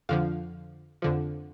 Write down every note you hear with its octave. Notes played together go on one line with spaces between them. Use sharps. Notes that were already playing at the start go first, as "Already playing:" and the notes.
F2 D3 F3 F5
F2 D3 F3